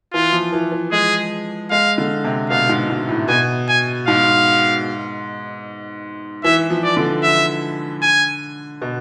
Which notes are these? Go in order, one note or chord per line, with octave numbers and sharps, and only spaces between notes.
E3 F4
F3
E3
E3
G#3 G#4
G#3 F5
D3
C3
B2 F5
G#2
G#2
A2
B2 G#5
G#5
G#2 F5
E3 E5
F3
D5
D3
E5
G#5
B2